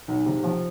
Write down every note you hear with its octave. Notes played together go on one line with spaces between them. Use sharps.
B1
C3
F3